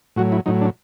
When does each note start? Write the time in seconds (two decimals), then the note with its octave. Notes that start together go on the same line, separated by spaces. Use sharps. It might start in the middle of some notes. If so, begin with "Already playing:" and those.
0.16 A2 F#3 F#4
0.32 E4
0.46 A2 F#3 D#4
0.61 D4